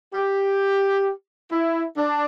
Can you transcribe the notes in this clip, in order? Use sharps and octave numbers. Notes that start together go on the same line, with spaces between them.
G4
E4
D4